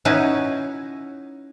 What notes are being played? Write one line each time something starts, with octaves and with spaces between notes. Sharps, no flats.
C#4 D#4 E4 F#4 B4